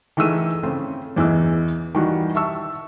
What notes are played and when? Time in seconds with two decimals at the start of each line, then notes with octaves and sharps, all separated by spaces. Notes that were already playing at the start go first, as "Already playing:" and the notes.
0.17 D#3 E3 A3 G#4 E6 D#7
0.63 C#3 A3 C4
1.16 E2 E3 G#4 D#5 E6
1.95 D#3 E3 G3 F#4
2.35 E5 A5 C#6 E6